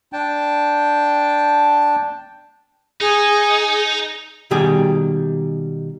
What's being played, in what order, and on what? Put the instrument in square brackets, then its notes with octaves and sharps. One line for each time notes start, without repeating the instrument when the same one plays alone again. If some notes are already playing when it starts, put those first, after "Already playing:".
[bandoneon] D4 G5 A5
[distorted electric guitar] D#4 [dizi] G#4
[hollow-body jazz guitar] B2 D#3 G3 G4 G#4